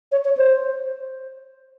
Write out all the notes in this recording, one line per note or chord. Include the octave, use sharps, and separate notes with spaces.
C#5
C#5
C5